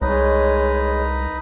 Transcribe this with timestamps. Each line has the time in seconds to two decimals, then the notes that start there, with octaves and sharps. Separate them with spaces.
0.02 C2 G#3 D#4 B4 C#5 A#5